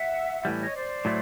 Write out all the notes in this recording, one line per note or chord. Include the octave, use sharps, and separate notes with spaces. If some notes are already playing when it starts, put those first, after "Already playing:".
Already playing: E5 F#5
A2 E3 G3
C#5 D#5
C5 D5
A2 F#3 A3